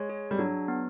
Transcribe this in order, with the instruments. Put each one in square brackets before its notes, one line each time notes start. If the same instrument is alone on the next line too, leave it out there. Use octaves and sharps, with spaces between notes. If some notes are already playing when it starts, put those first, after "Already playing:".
Already playing: [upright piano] G#3 [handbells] C#5
[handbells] G#4
[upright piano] G3
[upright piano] F#3 [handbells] D4
[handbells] B3